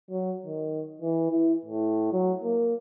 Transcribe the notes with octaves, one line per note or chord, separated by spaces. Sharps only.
F#3
D#3
E3
E4
A2
F#3
A#3